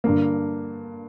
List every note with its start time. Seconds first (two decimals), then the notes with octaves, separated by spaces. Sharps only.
0.04 G2 D3 A#3